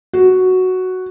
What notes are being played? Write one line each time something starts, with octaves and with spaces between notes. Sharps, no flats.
F#4